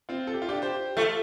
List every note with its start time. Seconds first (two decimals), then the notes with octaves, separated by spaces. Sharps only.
0.09 C4 F4
0.27 A4
0.34 G4
0.42 F4
0.48 D4 G4
0.62 G4 C5
0.97 A3 F4 A4